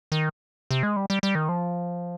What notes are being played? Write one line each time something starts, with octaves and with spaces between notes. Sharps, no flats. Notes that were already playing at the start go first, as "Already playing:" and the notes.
D#3
C3
G#3
G3
G3
G3
D#3
F3